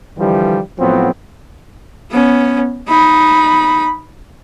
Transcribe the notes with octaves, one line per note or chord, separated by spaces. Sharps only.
D3 E3 F3 G3
A2 F3 F#3 B3 C4
B3 C#4
D#4 B5